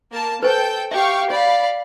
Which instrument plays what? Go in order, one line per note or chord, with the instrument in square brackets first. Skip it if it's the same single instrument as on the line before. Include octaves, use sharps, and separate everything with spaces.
[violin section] A#3 A#4 A5
[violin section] A4 G5 G6 [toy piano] B4 C5 G#5
[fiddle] G4 [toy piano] E5 [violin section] F5 G5 C#6
[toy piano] C#5 [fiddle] D5 F5 [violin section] B5